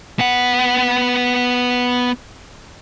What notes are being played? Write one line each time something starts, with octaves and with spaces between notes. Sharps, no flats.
B3 F#5